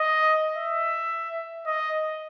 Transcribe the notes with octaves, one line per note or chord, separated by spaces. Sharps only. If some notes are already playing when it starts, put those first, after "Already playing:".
Already playing: D#5
E5
D#5